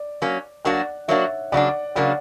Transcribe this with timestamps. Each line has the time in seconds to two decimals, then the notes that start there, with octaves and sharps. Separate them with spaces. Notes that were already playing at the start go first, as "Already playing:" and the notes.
Already playing: D5
0.22 F#3 A#3 C#4
0.65 F#3 A#3 D4 F#4 D5 F#5
1.08 F#3 A#3 D4 F#4 C#5 E5
1.52 C#3 F#3 A#3 D4 D5 F#5
1.96 C#3 F#3 A#3 D4 D5 F#5